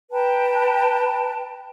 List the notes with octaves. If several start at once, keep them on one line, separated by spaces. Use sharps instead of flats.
B4 G5 A5 A#5